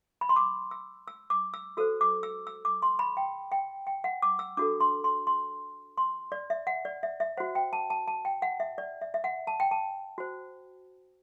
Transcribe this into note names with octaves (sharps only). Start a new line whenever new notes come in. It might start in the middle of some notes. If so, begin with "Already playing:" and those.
B5
C6
D6
E6
E6
D6
E6
F#4 A4 C5 E6
D6
E6
E6
D6
C6
B5
G5
G5
G5
F#5
D6
E6
D4 F#4 A4 D6
C6
C6
C6
C6
D5
E5
F#5
D5
E5
E5
F#4 C5 F#5
G5
A5
A5
A5
G5
F#5
E5
D5
E5
E5
F#5
A5
G5
A5
F#4 C5